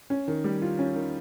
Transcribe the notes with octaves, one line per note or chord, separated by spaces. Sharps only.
C#4
D#3
G3
F4
C#4
D#3